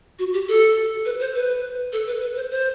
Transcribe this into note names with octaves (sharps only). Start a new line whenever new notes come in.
F#4
G4
A4
B4
C5
B4
A4
B4
B4
C5
C5